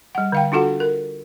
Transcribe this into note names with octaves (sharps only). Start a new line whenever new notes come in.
G3 F#5
D3 F5 G5
D4 F4 F#4 A4 F#5
A#4